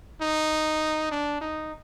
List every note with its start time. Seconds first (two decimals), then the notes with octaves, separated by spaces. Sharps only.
0.21 D#4
1.11 D4
1.41 D#4